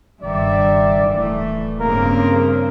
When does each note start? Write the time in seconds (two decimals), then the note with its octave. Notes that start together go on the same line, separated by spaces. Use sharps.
0.23 F#1 G2 D#3 D5 E5
1.08 D1 E3 A3
1.80 G2 C#3 A#3 C4 A#4